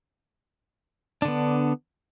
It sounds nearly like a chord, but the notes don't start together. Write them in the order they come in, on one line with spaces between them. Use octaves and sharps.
D4 D3 B3